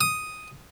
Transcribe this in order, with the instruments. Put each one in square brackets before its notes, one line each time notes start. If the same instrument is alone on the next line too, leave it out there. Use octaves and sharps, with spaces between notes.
[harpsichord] D#6